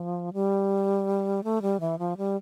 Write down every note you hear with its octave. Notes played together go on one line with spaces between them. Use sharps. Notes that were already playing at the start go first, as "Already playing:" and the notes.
Already playing: F3
G3
A3
G3
E3
F3
G3